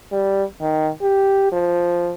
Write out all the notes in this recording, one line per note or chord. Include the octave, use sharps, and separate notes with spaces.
G3
D#3
G4
F3